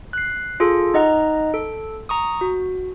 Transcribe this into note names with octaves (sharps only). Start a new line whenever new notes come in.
F#6 C7
F4 G#4 A4
D#4 D#5 F#5 A#5
A4
A#5 C#6 D#6
F#4